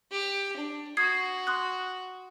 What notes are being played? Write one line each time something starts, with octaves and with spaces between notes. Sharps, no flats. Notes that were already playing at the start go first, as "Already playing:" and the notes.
G4
D4
F#4 D#6 G#6 C7
C6 D#6 F#6